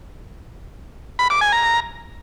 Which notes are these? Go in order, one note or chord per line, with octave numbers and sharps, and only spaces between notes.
B5
D6
G#5
A#5